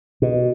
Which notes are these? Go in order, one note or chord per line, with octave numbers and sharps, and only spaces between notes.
B2